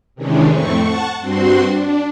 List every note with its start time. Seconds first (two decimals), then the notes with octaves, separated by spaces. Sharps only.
0.15 C3 D#3 E3 G#3 C#4 D4
0.47 F2 A2 A3 C4 C#6
0.80 F#5 A5 C#6
1.20 G2 C4 F#4 C6
1.63 D4